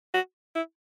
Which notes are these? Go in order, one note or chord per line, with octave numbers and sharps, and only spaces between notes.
F#4
E4